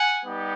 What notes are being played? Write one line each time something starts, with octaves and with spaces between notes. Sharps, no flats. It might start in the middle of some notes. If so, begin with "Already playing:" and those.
Already playing: F#5 G#5
G3 B3 D#4 G4